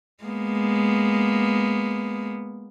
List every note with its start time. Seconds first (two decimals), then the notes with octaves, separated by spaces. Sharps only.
0.24 G#3 A#3 B3